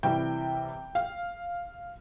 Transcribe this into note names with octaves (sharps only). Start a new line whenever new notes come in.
C3 E3 G3 G5
F5